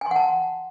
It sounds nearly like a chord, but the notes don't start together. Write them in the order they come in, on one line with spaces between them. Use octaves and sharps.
G#5 C6 F#5 A5